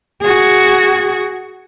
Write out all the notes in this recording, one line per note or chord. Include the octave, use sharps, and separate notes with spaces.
F#4 G#4